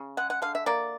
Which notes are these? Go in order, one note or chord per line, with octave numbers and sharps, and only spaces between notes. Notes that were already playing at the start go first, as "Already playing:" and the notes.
Already playing: C#3
G#3 F#5
F#5
D3 F5
E5
A#3 D5